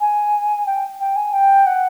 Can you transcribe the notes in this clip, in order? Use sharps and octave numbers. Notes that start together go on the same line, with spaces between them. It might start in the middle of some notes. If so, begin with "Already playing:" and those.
G#5
G5
G5
G#5
G5
F#5